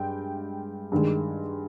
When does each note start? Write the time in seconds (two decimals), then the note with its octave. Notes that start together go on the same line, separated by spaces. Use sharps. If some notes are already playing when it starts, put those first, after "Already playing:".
Already playing: G2 G#3 G5
0.92 G2 D#3 G#3